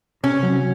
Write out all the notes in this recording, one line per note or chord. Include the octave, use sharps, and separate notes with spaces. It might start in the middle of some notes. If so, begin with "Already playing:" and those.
C3 C#4
F#3